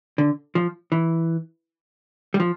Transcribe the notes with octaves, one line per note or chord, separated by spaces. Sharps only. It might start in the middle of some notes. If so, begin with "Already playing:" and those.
D3
F3
E3
G3
F3